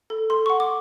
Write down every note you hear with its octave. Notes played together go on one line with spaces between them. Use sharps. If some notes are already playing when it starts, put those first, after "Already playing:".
A4
A4 C6
F#5 C#6
D6